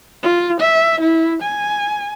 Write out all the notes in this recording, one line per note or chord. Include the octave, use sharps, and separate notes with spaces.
F4
E5
E4
G#5